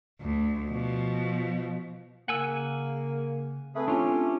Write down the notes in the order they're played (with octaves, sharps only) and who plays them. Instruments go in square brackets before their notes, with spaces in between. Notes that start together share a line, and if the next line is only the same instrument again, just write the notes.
[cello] D2
B2 F3
[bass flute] C#3 [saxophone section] A#3 [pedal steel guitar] F#5 G#5 E6
[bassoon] A3 [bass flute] C4 [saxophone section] G#4 B4
[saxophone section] C#4 [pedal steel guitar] D4 F4 G4